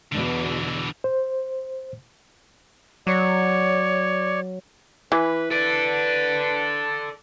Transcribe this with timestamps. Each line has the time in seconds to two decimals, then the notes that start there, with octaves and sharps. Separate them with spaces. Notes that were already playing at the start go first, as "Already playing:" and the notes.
0.12 E2 B2 D3 E3
1.04 C5
3.07 F#3 C#5 D5
5.12 E3 B4
5.51 A4 B4 D5